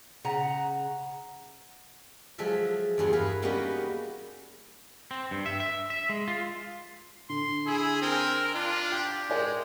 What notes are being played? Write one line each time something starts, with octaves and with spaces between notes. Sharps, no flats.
C#3 F#5 A#5
F3 F#3 G#3 G#4 A4 E5
E2 G2 G#4 C6
G#4 A#4 B4 F5
G3 A#3 B3 C#4 D#4 F#4
C4
G2
E5
E5
E5
G#3
F4
D3 C6
E4 G#4
C4 A#4
D4 F4
G4 G5
G#3 A#4 D5 G#5